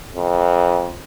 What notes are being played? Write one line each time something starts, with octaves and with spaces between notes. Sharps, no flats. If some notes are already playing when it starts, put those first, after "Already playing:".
F2